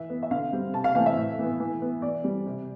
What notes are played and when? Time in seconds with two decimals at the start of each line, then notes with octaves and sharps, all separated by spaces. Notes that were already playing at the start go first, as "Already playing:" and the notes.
Already playing: E3 E5
0.10 B3
0.23 E5
0.31 D3 F5
0.53 G3 C4
0.74 C3 A5
0.84 F5
0.95 E3 A3 C4 F5
1.06 E5
1.16 A2
1.39 E3 B3
1.60 E3
1.82 B3
2.02 E3 D5
2.24 G3 C4
2.46 C3